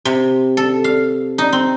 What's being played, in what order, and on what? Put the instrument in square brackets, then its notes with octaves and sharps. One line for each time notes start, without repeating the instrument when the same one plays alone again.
[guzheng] C3
A4
F5
D#4
C4